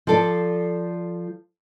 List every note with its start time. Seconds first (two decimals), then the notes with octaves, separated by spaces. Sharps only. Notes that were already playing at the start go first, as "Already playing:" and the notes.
0.07 F3 A4 D5